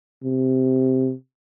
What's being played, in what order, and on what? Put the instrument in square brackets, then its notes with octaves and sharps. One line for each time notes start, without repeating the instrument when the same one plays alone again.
[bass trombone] C3